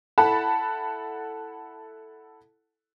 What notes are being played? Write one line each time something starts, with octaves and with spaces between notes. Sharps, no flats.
E4 A4 F#5 A5 B5